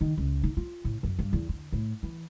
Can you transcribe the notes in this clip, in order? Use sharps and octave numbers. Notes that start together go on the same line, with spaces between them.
D#3
C#2
D#4
F4
A2
F#2
G2
E2
D3
A2
E3